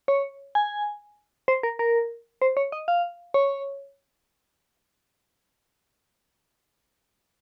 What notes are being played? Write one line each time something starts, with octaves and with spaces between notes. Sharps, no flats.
C#5
G#5
C5
A#4
A#4
C5
C#5
D#5
F5
C#5